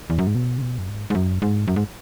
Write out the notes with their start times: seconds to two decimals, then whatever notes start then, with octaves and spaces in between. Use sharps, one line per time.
0.10 E2
0.19 F#2
0.27 G#2
0.35 B2
0.58 C#3
0.62 B2
0.78 F#2
0.89 G#2
1.10 G#2
1.15 F#2
1.42 G#2
1.68 F#2
1.76 G#2